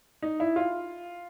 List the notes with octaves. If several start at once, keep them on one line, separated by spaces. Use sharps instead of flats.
D#4
E4
F4